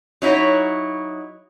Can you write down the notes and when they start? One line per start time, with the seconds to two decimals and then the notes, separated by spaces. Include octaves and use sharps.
0.22 F#3 D#4 E4 F#4 C#5